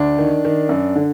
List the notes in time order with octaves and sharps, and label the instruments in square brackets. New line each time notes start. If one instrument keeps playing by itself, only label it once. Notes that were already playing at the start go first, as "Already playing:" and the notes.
Already playing: [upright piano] D2 D4
D#3
D#3
F#2
D3